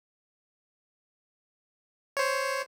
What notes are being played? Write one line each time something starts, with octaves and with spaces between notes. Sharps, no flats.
C5 C#5